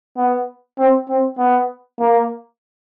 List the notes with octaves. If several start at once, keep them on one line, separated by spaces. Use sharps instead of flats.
B3
C4
C4
B3
A#3